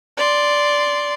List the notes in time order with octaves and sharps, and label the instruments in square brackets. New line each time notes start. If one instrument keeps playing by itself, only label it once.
[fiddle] D5 C6